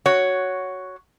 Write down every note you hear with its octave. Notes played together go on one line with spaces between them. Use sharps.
F#4 C#5